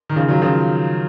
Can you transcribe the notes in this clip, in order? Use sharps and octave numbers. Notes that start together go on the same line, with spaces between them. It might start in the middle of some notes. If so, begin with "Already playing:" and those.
D#3
C#3 F3
D#3 F#3
C#3 F3